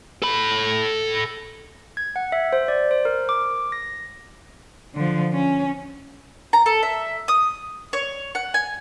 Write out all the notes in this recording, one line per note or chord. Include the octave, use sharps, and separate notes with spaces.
A4 B5
G#6
F#5
E5
C5
D5
C5
A#4
D6
A#6
D3 F3
C#4
A#5
A4
E5
D#6
C#5
F#5
G#5